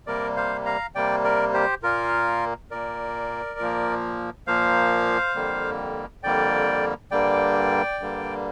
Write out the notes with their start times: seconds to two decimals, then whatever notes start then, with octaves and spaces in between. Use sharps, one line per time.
0.07 C3 G3 A#3 A#4 D5
0.36 C5 F5
0.66 F5 A#5
0.95 C3 G3 A#3 D5 G5
1.24 A#4 D5
1.54 G4 C5
1.83 A#2 A#3 F4 A#4
2.71 A#2 A#3 A#4 D5
3.59 A#2 F3 A#3
4.47 A#2 F3 A#3 C5 F5
5.35 F2 D3 G3 A#3
6.23 F2 D3 G3 A#3 D5 G5
7.11 G2 D3 G3 A#3 D5 G5
8.00 G2 D3 G3 A#3